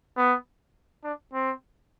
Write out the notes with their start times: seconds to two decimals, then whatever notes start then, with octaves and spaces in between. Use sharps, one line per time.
0.17 B3
1.04 D4
1.33 C4